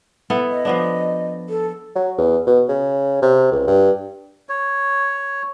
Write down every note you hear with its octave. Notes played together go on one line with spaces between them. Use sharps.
B3 E4 A4
D#5
F3 B3 D4
A4
F#3
E2
B2
C#3
C3
C#2
G2
C#5